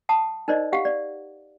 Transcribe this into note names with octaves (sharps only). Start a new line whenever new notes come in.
F#5 A5 D#6
D#4 A#4 C5 D5 D#5
G4 F5 F#5
D5